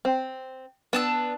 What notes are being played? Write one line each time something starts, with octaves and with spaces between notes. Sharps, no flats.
C4
B3 D4 A5 E6